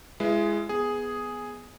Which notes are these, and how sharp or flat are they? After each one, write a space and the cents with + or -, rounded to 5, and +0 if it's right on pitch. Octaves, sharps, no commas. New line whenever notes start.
G#3 +0 E4 +35 B4 +10
B3 +0 G#4 +0